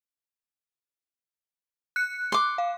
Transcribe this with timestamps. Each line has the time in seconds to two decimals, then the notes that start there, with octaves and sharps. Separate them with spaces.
1.96 F#6 C#7
2.32 C6 D6
2.58 F5